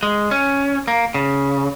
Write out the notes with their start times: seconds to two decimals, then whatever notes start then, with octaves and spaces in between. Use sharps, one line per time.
0.03 G#3
0.31 C#4
0.88 A#3
1.14 C#3